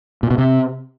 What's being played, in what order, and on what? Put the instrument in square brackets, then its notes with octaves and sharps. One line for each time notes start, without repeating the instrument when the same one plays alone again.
[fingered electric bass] A#2
B2
C3